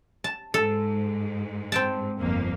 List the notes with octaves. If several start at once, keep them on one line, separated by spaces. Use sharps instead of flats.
A5
G#2 A4
C4 G5 A5
G1 F2 A#3